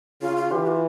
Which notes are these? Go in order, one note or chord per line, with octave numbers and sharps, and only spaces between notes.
C#3 F4
F4
E3 G4
F4